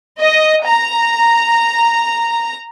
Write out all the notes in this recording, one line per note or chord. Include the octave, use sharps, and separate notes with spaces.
D#5
A#5